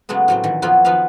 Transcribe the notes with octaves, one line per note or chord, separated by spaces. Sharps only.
C#3 F#3 G#3 A3 B3
A2 F#3 C4
A#2 D#3 E3
F2 F#3 B3 E4 F4
D#3 F3 B3 F4 B4 F5